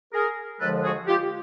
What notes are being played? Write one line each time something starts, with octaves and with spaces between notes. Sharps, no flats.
G#4 A#4
D#2 D3 F3 G#3 A4 B4
F#4 G#4
F4 G4